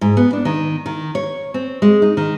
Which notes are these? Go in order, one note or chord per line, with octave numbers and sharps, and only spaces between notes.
G#2
B3
D4
D#3
D#3
C#5
C4
G#3
D#4
D#3